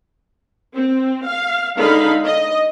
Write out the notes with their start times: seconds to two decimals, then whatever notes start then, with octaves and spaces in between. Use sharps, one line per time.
0.74 C4
1.27 F5
1.77 D3 G#3 D#4 F5 B5
2.25 D#5